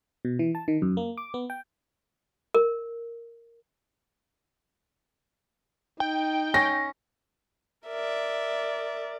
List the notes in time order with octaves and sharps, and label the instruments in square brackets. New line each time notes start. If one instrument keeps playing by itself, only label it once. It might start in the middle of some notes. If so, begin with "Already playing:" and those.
[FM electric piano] B2
E3
A5
D#3
F#2
A#3
D6
B3
G5
[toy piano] A#4
[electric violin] D#4 [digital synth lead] G5
[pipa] C#4 [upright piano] A#6
[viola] A#4 D5 [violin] E5